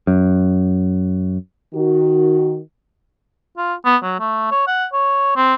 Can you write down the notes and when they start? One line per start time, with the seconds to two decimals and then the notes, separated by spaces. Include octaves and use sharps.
0.07 F#2
1.74 D#3 F#4
3.57 F4
3.85 B3
4.03 F#3
4.20 A3
4.51 C#5
4.67 F#5
4.93 C#5
5.36 C4